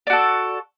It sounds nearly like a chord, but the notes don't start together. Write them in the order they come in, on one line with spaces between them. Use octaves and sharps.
D5 F#4 A4